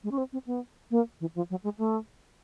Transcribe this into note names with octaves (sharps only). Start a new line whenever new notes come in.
G#3
C#4
C4
C4
B3
A#3
E3
F3
F#3
G#3
A3